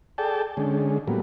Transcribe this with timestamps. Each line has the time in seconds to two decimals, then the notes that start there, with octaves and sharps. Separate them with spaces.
0.18 G#4 A4 D5 G5 A5
0.57 D3 G#3 C#4
1.08 A2 F#3 G3 A#3 B3